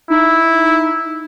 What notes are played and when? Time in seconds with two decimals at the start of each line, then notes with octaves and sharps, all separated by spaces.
0.10 D#4 E4